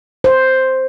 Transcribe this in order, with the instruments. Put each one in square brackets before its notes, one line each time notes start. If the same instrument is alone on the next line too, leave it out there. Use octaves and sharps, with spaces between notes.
[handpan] C5